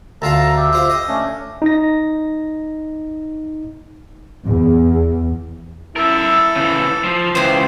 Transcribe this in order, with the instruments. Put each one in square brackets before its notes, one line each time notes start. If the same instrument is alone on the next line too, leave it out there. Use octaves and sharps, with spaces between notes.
[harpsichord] D2 F4 F5 [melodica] A4 A5 A#5
[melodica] G4 E5
[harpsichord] F4 C5
D#5
[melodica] A3 C#4 D4
[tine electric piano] D#4 A#6
[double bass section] E2
[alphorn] E4 [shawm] A4 [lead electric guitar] A#4 E5
[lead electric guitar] C#3 E3
[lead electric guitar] F3 [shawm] C6
[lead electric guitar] C#2 [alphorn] E3 [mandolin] G4 G#4 C5